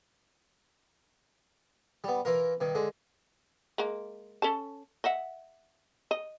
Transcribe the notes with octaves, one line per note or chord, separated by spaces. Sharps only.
G3 B3
E3 F4 A#4
G2 D#3
D3 G#3
G#3 A#3
C#4 A4 A5
D#5 E5 F#5
D#5